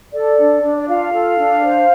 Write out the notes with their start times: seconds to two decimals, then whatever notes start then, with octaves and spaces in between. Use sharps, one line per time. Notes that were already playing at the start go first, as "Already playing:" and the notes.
0.12 A4 D5
0.39 D4
0.63 D4
0.77 D5
0.87 F4 F5
1.13 A4
1.38 D4
1.63 C5